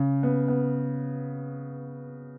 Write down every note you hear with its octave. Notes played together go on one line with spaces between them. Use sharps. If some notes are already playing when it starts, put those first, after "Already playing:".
Already playing: C#3
B3
B3